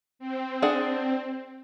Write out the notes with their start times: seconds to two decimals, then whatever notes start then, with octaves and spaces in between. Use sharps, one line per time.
0.19 C4
0.62 D4 G#4 F#5